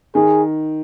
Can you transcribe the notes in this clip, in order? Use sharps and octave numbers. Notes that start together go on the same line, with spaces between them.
D#3 G#4